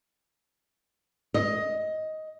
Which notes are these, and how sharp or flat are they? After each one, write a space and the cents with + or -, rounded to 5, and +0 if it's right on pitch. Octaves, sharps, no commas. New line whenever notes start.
D#5 +10